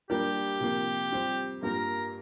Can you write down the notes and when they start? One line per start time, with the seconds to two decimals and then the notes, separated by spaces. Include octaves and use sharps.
0.10 G3 A#3 D4 G4 A#4
0.60 C3 F3 A#3
1.12 G3 C4 F4 C5
1.63 G2 G3 A#3 F4 A#4